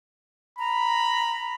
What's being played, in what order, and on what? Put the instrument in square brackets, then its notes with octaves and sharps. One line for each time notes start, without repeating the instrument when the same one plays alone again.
[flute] A#5 [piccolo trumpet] B5